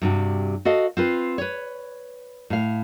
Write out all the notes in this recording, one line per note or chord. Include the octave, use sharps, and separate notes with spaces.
G2 C3 F#4
F#4 A4 D#5 F5
C4 F4 B4
B4 C#5
A2 F5